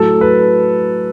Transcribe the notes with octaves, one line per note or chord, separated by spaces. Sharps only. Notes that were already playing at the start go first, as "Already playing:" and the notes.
Already playing: A2 F#3 A4
B4